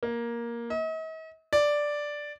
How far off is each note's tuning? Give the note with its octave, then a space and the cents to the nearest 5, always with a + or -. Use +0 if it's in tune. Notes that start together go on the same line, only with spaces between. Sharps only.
A#3 +10
D#5 +45
D5 +0